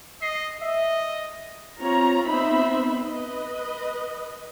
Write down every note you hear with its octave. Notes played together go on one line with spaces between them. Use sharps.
D#5 C7
D#5 E5
C4 F4 C#5 A#5
B3 C4 D#4 C5 E5 B5
B4 D#5